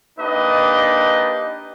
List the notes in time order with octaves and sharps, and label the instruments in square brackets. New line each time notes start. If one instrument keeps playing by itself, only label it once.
[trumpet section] A#3 D4 D#4 G4 B4 D#5